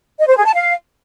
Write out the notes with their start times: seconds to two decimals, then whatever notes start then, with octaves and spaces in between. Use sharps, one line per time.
0.19 D#5
0.28 C5
0.36 G#4
0.45 A5
0.54 F5